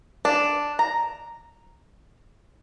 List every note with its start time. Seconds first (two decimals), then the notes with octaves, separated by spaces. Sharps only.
0.25 D4
0.79 A#5